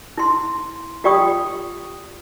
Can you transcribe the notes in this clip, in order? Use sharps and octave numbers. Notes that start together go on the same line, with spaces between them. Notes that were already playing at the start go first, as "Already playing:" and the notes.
E4 C6
F4 G4 D5 G5 C#6 D#6